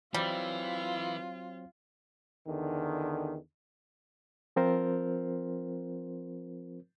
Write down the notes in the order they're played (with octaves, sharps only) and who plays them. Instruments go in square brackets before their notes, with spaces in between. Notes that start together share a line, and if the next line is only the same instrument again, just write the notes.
[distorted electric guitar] E3 [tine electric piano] F#3 C4 [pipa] G3 [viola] F4
[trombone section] E2 D3 D#3
[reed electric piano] F3 C4 F4 A#4 C5